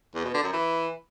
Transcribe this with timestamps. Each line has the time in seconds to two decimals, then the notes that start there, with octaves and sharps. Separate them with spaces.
0.15 E2
0.24 B2
0.34 D3
0.43 F#2
0.53 E3